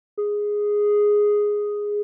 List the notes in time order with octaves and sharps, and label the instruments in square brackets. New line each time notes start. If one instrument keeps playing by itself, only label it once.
[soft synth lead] G#4